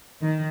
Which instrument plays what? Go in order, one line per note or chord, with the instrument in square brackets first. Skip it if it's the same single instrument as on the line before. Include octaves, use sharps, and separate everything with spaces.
[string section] D#3